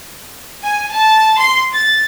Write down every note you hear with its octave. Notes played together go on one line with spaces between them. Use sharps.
G#5
A5
C6
A6